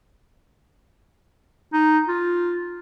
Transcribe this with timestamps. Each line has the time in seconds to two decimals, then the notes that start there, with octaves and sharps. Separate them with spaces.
1.73 D#4
2.08 F4